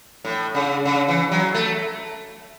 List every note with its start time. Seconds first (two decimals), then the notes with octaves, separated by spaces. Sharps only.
0.25 A2
0.55 C#3
0.85 C#3
1.08 E3
1.32 F#3
1.54 A3